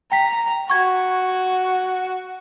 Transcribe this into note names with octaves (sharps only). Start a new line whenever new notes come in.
G5 A#5 B6
F#4 C#6 G#6